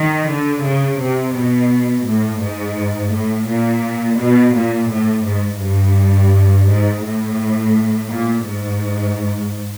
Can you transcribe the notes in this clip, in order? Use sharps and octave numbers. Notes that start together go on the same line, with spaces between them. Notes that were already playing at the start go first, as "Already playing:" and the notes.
Already playing: D#3
D3
C#3
C3
B2
A2
G#2
A2
A#2
B2
A#2
A2
G#2
G2
G#2
A2
A#2
G#2